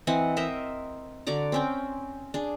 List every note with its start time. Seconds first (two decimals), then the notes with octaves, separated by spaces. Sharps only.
0.07 E3 C4 D#5 F#5
0.37 A#4 C5 D#5 E5
1.27 D3 F#4 D5 A#5
1.52 C4 C#4 G5
2.34 D4 G#4